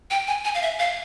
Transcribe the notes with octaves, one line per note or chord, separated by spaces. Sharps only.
G5
G#5
G#5
F5
E5
F5